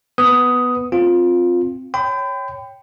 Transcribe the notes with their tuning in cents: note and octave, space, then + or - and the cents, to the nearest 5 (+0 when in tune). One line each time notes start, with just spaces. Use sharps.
B3 +0 B4 +0 D#6 +5
C4 +0 F4 +10
C#5 +0 G5 +0 B5 +40